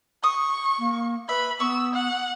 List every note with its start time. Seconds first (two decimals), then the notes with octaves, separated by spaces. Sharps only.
0.24 C#6 D#6
0.79 A#3
1.29 B4 E5 B5
1.60 B3 C#6 E6
1.94 F#5